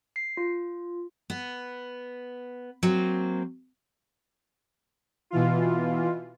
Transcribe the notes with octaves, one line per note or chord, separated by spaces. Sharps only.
C7
F4
B3
F#3 A#3 C4
B2 E3 F4